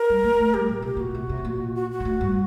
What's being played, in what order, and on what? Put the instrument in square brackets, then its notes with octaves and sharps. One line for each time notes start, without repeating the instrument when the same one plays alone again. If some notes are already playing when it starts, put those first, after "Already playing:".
Already playing: [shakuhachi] A#4
[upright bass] G3
A#3
A3
[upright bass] G3 [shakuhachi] G4
[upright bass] A#2
[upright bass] C3 [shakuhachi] G4
[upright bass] A#2 [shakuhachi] F#4
[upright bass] C3
C3
A#2
[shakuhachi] F#4
F#4
[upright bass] A#2
A2
G2